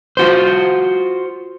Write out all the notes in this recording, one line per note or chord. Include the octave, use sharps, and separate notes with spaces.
F4 F#4 C5